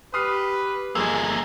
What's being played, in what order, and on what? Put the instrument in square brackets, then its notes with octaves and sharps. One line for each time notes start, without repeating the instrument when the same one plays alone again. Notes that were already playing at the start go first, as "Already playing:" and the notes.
[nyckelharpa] G4 [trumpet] B4 [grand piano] D#6 F6 C7
[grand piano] G1 F3 E6 [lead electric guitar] E2 A#3 [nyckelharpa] G#3 G#5 [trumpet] G#4